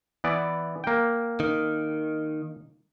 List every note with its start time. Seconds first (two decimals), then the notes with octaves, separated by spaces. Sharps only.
0.24 E3 B3 D5
0.84 A#3 G5
1.40 D#3